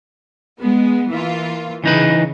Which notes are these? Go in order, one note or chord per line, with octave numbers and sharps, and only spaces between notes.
G#3 B3
E3 A#3 F4
C#3 E3 D#4 B4